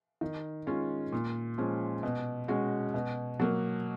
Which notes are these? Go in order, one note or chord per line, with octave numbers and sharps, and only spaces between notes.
D#3
G#3 C#4 F4
A#2
F3 G#3 C#4
B2
G#3 C#4 F#4
B2
F#3 A#3